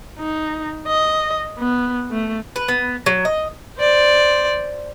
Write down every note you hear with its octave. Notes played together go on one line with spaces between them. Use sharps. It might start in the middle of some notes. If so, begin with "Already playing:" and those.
D#4
D#5
B3
A3
B4
B3
F#3
D#5
C5 D5